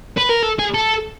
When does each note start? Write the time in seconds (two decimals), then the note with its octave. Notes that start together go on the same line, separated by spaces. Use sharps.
0.18 B4
0.30 A#4
0.43 A4
0.59 G#4
0.74 A4